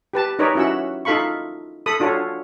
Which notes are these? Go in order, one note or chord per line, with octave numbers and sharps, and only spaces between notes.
G4 B4 A5
D#4 A#4 B4 C#5 D5
C#4 E4 F#4 F#5 E6
D#4 F4 A4 F5 B5 C#6
A4 B5 D#6
D4 F4 F#4 A4 C#5